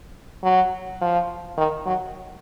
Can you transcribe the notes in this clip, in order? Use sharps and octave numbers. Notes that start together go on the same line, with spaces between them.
F#3
F3
D#3
F#3